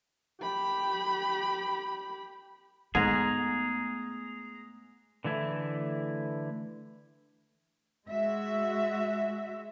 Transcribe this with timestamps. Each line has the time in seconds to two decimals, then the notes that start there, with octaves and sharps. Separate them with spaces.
0.42 G4 B5
2.95 G#2 A3 B3 G#4 A#5
5.24 D3 E3 A3 E4
8.07 G#3 F#4 E5